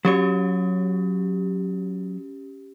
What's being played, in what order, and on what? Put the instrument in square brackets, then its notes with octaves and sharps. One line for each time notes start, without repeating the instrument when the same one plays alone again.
[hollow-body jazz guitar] F#3 C#5 [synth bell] C#4 G4